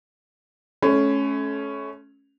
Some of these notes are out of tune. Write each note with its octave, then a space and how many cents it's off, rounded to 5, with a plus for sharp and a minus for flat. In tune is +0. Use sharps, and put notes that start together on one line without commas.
A3 -30 C#4 +0 B5 +40